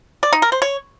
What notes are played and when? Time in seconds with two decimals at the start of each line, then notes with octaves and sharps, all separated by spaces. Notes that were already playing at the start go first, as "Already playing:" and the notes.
0.23 D5
0.33 D#4
0.42 A#4
0.52 C5
0.62 C#5